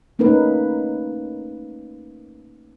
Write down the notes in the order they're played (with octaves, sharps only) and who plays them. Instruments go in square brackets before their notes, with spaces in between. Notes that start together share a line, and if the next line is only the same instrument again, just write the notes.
[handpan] A3 A#3 C#4 D#4 A#4 B4